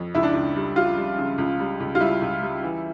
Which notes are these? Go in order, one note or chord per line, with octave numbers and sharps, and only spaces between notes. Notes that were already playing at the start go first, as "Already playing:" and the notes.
Already playing: F2
C#2 E4
D4
C#2 E4
G3
G3 F4
G3
C#3
C#2
G3
C#2
F4
G3 E4
C#2
G3
E3